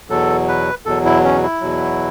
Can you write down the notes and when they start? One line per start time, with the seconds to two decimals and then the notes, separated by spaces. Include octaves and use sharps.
0.09 E2 B2 F#3 A4
0.48 B4
0.86 E2 B2 F#3 A4
1.05 E4
1.24 C#4
1.43 E4
1.61 E2 B2 F#3